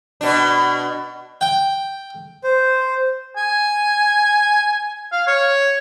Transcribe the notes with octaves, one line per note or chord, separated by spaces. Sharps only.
B2 D4
G5
C5
G#5
F5
C#5